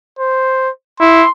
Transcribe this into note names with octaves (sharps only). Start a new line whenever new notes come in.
C5
E4 C6